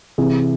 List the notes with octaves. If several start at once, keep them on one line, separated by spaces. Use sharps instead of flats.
C3 E3 G#4